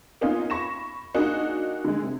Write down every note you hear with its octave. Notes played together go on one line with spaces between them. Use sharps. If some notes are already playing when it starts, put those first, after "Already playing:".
A#3 B3 C#4 D#4 F4
B5 C#6 A#6 E7
A#3 D4 D#4 F#4 G#4
D3 G#3
C3